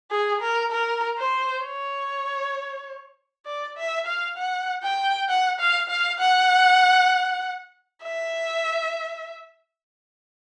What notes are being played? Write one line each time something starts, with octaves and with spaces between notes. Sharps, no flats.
G#4
A#4
A#4
C5
C#5
D5
E5
F5
F#5
G5
F#5
F5
F5
F#5
E5